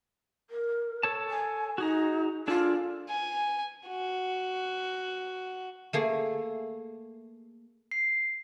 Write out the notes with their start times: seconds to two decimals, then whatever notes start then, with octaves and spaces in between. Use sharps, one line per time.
0.50 A#4
1.03 A4 C#5 A5
1.30 G#5
1.78 D#4 F#4 G#4 A#5
2.48 D4 F4 G#4 A4
3.09 G#5
3.88 F#4
5.93 A3 A#3 G#4
7.91 C7